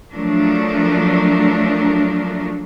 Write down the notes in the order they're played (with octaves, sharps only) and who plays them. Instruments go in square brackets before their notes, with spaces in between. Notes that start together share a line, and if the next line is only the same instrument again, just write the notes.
[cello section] F3 F#3 A3 D4 A#4